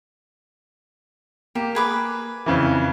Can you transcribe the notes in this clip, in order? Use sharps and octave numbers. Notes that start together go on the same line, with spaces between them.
A#3 G4
G#4 B4 D6
F2 C#3 E3